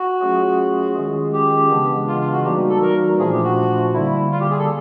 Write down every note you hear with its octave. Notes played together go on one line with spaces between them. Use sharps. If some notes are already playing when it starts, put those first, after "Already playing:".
Already playing: F#4
F#3 A3 C#4 F4 G#4
D#3 G#3 C#4 F4 G#4
G4
C#3 E3 G#3 B3 D4
F4
F4
F#4
E3 G3 A#3 D#4 F#4 G4
A4
A#4
A#2 F3 A3 D4 F4 G#4
G4
F#4
D3 G3 A#3 E4
F4
G4
G#4
A4